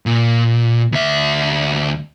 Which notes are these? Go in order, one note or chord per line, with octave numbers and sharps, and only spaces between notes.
A#2
D2 E5